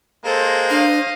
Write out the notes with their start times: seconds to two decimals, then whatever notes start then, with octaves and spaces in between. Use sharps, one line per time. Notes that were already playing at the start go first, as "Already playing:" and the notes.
0.25 G#3 A#3 A4 C5
0.70 D4 D#5 F5